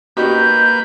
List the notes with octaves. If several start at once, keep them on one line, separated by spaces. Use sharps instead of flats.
A#3 D#4 F#4 G4 B4 G6